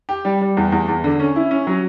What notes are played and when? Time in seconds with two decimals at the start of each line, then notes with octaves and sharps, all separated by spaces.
0.09 G4
0.25 G3
0.41 G3
0.57 E2
0.72 E2
0.88 E2
1.04 D3
1.20 C#4
1.36 E4
1.51 C#4
1.67 F#3